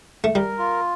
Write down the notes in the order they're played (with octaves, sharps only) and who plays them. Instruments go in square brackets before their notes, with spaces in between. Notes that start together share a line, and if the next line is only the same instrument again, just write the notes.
[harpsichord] A3
[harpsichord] G3 [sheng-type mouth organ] A#4
[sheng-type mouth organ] F4